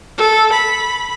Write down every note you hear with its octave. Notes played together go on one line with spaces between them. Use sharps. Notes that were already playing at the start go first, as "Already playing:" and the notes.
A4
B5